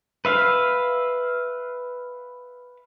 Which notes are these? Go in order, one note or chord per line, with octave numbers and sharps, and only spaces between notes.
B4 E5 F5